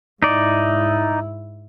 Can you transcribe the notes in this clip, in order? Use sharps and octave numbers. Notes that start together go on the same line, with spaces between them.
G#2 D#4 E4 D5